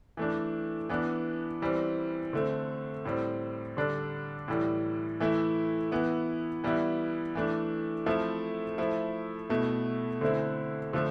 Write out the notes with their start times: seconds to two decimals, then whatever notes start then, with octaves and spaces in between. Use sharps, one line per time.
0.17 E3 A3 D4
0.89 E3 B3 D4
1.62 E3 G3 C4
2.33 D3 A3 C4
3.05 A2 G3 C4
3.77 D3 G3 D4
4.48 A2 E3 G3
5.20 E3 A3 E4
5.91 E3 B3 E4
6.64 E3 G3 B3 E4
7.35 E3 A3 D4
8.06 F3 A3 C4 E4
8.78 F3 A3 E4
9.49 B2 A3 E4
10.21 D3 A3 C4 E4
10.93 D3 F3 A3